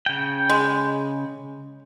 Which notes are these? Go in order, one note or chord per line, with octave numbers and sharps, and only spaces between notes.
C#3 G5
G#3